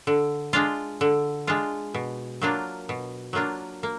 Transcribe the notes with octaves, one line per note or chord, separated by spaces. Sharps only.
D3
G#3 D4 F4
D3
G#3 D4 F4
B2
F#3 A#3 D4 F4
B2
F#3 A#3 D4 F4
A#3